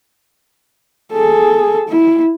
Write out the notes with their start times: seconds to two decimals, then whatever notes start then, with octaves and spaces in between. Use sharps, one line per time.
1.12 G#4 A4
1.88 E4